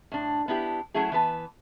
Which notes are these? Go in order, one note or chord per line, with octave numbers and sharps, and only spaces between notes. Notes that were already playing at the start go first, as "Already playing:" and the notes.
A2 D4
B3 D4 E4 G4
F#3 A3 C#4 E4 G#4
E3 B3 B4 A5